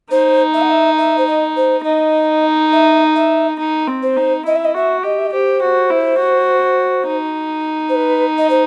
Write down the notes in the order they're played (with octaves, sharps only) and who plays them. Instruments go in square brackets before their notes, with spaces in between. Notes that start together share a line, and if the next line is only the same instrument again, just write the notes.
[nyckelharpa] D#4 [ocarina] C5
[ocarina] E5
F#5
E5
E5
C5
D#5
C5
[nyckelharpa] D#4 [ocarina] D#5
[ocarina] E5
E5
[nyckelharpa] D#4
C4
[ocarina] C5
[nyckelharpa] D#4
[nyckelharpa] E4 [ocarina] D#5
[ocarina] E5
D#5
[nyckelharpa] F#4 [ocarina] E5
[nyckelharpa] G4 [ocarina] D#5
[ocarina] E5
D#5
[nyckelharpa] G4 [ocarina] C5
[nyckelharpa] F#4
E4
F#4
D#4
[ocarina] C5
B4
D#5
C5